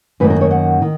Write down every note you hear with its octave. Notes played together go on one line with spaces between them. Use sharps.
F#2 D#3 A#3 B4
A#4
C#5
F#5
D#3